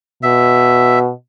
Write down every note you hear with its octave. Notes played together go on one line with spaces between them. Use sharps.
B2 E5